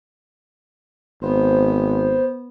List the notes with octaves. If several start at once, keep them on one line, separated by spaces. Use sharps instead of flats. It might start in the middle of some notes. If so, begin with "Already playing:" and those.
G#1 B3 C5